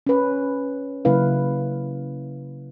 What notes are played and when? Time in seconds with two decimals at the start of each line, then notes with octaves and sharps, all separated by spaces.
0.07 C#4 B4
1.05 C#3 F#3 A#3 E4 B4 F5